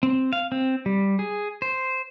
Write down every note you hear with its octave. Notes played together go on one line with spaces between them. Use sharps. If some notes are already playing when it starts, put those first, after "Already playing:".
C4
F5
C4
G3
G#4
C5